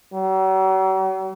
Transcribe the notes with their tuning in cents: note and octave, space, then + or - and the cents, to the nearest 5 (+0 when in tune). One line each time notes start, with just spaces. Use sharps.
F#3 +45